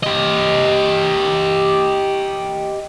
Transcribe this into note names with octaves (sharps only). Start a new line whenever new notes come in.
G4 D#5